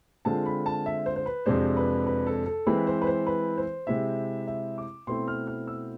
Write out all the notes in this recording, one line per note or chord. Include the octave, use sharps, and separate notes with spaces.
D3 G#3 C4 F4 A5
B5
A5
E5
C5
C5
B4
F2 C3 G#3 D4 C5
B4
B4
A4
A4
E3 G#3 C4 E4 B4
C5
B4
C5
B4
C5
C3 G#3 C4 E4 E5
E5
D6
B2 A3 C4 E4 C6
F6
F6
E6